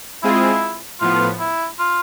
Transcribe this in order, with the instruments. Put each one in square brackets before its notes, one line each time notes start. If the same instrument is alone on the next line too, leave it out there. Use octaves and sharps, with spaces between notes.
[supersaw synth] G#3 C4 F4 G#4 [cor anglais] E4
[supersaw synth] A2 F3 B3 [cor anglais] F4
[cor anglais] E4
F4